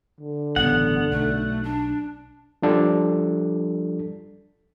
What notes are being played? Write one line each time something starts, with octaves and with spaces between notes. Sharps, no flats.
D3
A1 G2 C#3 B3 F#5
B1 A3
D4
F3 G3 D4 A4